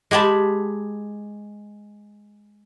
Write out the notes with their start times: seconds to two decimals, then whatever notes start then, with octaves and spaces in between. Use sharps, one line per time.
0.11 G#3 G4 G#4 A5 B5